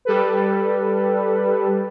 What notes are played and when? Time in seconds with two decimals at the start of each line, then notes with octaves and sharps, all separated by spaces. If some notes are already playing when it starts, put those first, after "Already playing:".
0.05 G3 A4 B4